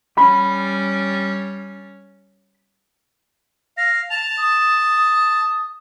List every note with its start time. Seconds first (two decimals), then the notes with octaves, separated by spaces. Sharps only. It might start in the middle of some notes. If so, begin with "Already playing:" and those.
0.18 G3 C#4 B5
3.77 F5 A#6
4.10 A5 F7
4.38 D#6